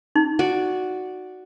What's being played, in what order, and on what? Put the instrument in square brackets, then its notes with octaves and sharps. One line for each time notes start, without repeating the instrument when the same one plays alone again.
[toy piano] D#4
[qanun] F#4 D5